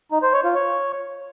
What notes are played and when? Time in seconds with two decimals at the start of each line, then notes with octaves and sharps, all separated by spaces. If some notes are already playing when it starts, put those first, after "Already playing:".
0.12 D#4
0.23 C5
0.33 C#5
0.44 F4
0.55 C#5